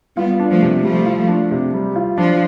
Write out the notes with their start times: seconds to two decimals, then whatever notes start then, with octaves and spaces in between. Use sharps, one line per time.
0.17 G3 B3 F4
0.39 D4
0.51 F3 A3
0.62 C3
0.84 F3 G3 A3
1.06 F4
1.28 D4
1.51 C3
1.74 G3
1.96 F4
2.17 F3 D4